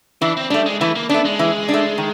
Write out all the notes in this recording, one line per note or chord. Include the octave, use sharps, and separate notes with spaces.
E3 D4
C4
G3 A3 D4
G#3
E3 A3
A#3
A3 B3 D4
G#3
E3
D4
A3
D#3